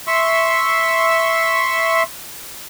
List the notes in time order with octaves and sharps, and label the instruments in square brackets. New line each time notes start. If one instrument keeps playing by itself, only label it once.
[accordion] E5 C6 C#6 E6